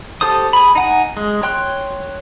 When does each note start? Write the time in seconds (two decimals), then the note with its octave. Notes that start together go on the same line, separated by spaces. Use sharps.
0.21 G4 A4 C5 D#6
0.53 G#4 B5
0.75 D#4 F#5 G#5
1.17 G#3
1.43 C#5 G5 C6 F#6